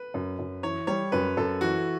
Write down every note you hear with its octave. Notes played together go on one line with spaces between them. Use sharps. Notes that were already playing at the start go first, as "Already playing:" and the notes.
Already playing: B4
F#2
F#2
E3 C#5
G3 C#5
F#2 B4
F#2 A4
E3 F#4